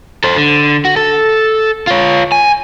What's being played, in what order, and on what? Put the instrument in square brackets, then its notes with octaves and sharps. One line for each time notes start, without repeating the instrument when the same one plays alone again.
[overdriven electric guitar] A4 C5
D3
F#4
A4
F4 C#5
G#5